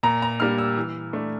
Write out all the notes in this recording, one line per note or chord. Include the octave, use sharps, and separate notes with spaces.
A#2 A#5
A#5
G3 A#3 D4 F6
E6
E3
A3 D4